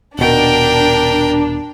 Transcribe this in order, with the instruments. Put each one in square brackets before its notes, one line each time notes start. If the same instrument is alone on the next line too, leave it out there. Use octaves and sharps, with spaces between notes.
[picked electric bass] D#1 B2 [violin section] D4 [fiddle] A#4 G5